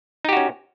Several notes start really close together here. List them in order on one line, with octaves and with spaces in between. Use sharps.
D#4 G4 F#4 C#4